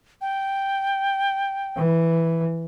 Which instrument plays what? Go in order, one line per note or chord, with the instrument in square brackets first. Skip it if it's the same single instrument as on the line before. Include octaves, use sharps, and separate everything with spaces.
[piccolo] G5
[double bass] E3